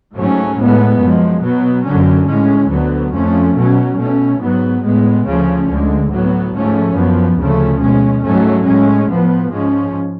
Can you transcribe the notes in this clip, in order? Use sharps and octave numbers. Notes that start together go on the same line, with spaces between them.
G#2 F#3 A3 C#4
A2 G#3 B3
F#2 F3 G#3
B2 F#3 B3
F#2 D3 F#3 C#4
A2 G#3 C#4
D2 D3 F#3 B3
F2 F3 A3 C#4
B2 F#3 C#4
B2 A3 C#4
G#2 F#3 B3
A2 G#3 B3
D2 C#3 F3 A3 C#4
D2 D3 G#3
A2 F#3 B3
G#2 F3 A3 C#4
F#2 F3 B3
D2 C#3 F3 A3 C#4
B2 G#3 C#4
G#2 F#3 A3 C#4
A2 G#3 C#4
A2 F3 B3
G#2 F3 G#3 C#4